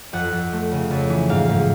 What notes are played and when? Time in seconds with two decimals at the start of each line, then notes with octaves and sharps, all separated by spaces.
0.13 F2 F#5
0.32 F2
0.53 A3
0.72 C#3
0.91 F2
1.10 E3
1.29 G#2 F5
1.49 G#2